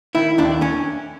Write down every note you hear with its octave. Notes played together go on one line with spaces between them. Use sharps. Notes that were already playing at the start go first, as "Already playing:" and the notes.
D#3 E4
D#2 D4
C#4